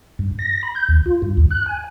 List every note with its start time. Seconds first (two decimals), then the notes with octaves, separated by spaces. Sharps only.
0.19 G2
0.39 A#6
0.63 B5
0.75 G6
0.89 D#2
1.06 F4
1.22 G2
1.37 D#2
1.50 F#6
1.66 G#5